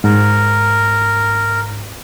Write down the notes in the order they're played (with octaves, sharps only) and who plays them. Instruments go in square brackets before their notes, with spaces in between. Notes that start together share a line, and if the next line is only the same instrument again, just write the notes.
[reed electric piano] G#2 [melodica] A#4